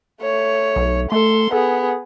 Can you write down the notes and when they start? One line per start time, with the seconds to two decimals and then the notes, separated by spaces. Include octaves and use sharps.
0.22 A3 C#5
0.76 B1
1.12 A3 A4 C6
1.52 B3 G#4 A4